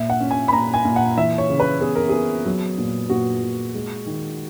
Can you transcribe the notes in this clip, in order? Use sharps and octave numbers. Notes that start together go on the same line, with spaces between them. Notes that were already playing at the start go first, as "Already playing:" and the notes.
Already playing: A#2 E5
F#5
C#4
G#5
B5
A#2 A#5
G#5
A#2
F#5
E3 E5
C#5
C#3
B4
B3 G#4
A#4
B3 G#4
F#3
A#2
A#2 F#4
A#2
G#3
D#3